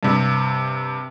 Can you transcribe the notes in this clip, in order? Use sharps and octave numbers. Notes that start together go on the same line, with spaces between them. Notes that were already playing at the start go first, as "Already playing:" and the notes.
G2 C3